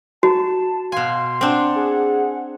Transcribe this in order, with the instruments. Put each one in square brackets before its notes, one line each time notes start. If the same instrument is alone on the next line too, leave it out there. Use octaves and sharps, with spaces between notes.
[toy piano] F#4 [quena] A5
[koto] B2 G#5 [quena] F5 [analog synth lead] C6
[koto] C4 D4 [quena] F#5
[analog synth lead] G#4